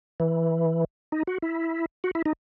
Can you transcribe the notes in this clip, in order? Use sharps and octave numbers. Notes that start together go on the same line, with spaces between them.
E3
D#4
F#4
E4
F#4
E4
D#4